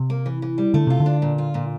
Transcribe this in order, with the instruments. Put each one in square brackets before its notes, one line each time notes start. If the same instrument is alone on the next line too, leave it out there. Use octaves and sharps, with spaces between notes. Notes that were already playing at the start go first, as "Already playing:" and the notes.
Already playing: [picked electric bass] C3
[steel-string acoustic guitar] A#3
E3
E3
G3
[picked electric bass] D3 [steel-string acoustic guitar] A3
[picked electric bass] C3 [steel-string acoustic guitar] F4
[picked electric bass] D3
[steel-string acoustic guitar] D4
A#2
F4
A#2